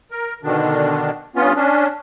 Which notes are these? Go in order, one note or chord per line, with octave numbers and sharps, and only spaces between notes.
A#4
B2 D3 D#3 D4
G2 B3 C#4 F4
C#4 D4